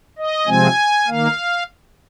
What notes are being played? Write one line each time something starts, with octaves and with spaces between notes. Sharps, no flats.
D#5
C3 F3 G#3 C4 G#5
D#3 A#3 F5